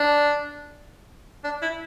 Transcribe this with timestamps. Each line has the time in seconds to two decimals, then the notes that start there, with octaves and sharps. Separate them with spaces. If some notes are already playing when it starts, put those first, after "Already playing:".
Already playing: D4
1.44 D4
1.62 E4